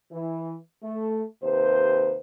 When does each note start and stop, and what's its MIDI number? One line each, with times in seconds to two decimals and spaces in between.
0.11 0.56 52
0.82 1.24 57
1.43 2.17 39
1.43 2.17 48
1.43 2.17 71
1.43 2.17 72